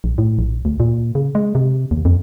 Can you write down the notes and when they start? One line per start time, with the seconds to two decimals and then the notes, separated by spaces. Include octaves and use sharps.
0.04 A#1
0.18 A2
0.39 A#1
0.65 D2
0.80 A#2
1.15 C#3
1.35 G#3
1.55 C3
1.91 D#2
2.05 F2